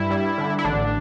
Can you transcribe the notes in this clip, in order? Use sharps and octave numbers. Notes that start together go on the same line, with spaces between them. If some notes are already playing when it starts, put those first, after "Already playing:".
Already playing: G2 E4
G3
D3
E4
A1 D4